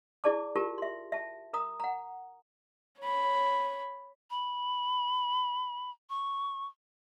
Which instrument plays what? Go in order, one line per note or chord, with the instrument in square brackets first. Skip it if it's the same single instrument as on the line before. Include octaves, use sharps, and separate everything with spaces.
[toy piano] E4 G#4 D5 A5 D6
F4 G4 A#4 A5
E5 C6
E5 A5
A#4 A#5 D#6
F#5 A#5
[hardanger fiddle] C#5 B5
[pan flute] B5
C#6